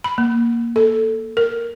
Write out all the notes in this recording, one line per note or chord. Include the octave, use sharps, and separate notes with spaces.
B5
A#3
A4
A#4